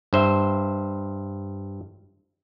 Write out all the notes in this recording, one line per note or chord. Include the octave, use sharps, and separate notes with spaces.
G2 C5 E5